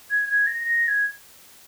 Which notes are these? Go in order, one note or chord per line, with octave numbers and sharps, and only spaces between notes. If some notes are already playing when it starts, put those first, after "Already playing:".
G#6
G#6
A#6
A#6
G#6